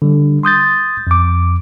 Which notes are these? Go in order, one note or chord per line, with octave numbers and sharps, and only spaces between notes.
D3 G3
C6 D#6 G6 A6
F2 D6